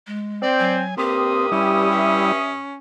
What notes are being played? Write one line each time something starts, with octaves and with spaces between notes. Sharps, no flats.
G#3
C4 D5
F#3 G#5
G2 A#3 C4 G4 D#6
G3 C#4 E4
E5